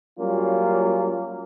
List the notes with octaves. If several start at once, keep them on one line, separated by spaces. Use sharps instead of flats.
F#3 G3 A#3 C#4 F4